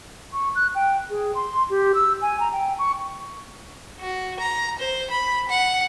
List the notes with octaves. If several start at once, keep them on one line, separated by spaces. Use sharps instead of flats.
C#6
F#6
G5
G#4
C6
G4
E6
G#5
A#5
G5
C#6
F#4
A#5
C5
B5
F#5